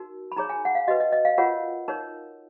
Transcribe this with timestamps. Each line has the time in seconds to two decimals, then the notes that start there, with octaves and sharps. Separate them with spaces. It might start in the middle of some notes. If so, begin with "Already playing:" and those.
Already playing: D#4 F#4 A#4
0.32 B5
0.37 D#4 G#4 C#5 A#5
0.50 G#5
0.65 F#5
0.75 F5
0.88 F#4 B4 D#5
1.00 D#5
1.12 D#5
1.25 F5
1.38 F4 A#4 C#5 F#5
1.88 D#4 A#4 C#5